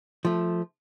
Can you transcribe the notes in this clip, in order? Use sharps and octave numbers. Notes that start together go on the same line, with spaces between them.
F3 A3